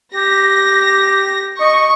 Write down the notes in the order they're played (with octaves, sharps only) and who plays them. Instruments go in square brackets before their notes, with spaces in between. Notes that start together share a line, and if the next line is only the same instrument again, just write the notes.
[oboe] G4 [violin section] A#6
[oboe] D#5 [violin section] C#6